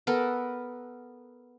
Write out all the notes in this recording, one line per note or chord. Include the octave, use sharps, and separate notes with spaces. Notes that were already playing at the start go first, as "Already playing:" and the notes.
B3 A4 A#4